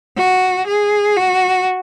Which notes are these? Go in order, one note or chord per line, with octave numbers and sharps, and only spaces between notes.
F#4
G#4
F#4